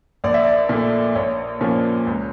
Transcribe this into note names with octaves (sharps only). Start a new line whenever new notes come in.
A#1 D5
E5
D5
A#2 A3
A#1 C#5
A#2 F3 A#3 C#4
C#2